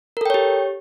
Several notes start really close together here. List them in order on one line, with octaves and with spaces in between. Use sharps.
A#4 A4 G5 C#5 G4